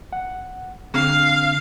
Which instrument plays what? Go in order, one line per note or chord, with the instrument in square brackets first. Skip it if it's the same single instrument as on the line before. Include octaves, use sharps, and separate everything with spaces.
[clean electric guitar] F#5
[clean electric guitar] D3 C4 [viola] F5